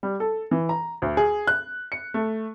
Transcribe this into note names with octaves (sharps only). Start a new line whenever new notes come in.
G3
A4
E3
A#5
D2
G#4
F#6
C#7
A3